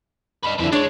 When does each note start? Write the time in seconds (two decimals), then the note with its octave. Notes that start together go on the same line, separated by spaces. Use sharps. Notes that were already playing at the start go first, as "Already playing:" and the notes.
0.44 D4 B4 D#5
0.59 F2 D3 F3 E4 B4
0.73 G#3 D4 C#5